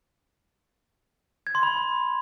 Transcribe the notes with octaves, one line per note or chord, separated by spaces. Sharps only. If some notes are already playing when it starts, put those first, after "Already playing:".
G#6
C6
B5